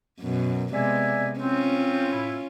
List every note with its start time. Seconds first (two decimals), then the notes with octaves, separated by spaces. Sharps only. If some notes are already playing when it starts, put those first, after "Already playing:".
0.21 F#2 B2
0.73 C3 G#3 B3 D5 E5 G#5
1.40 C4 C#4 F4
2.12 A2 E4